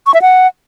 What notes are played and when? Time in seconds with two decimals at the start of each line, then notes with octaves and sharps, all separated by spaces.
0.07 C#6
0.14 E5
0.22 F#5